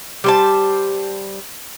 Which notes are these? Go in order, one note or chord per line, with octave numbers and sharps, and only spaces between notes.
G3 C5 A5